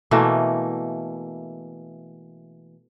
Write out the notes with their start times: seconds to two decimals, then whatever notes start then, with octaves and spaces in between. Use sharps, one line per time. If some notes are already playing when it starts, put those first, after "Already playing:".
0.11 B2 E3 A3 A#3